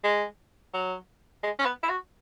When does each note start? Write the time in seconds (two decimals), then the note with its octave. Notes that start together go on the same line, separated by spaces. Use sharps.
0.04 G#3
0.74 F#3
1.43 G#3
1.59 C#4
1.66 B3
1.83 E4
1.90 F#4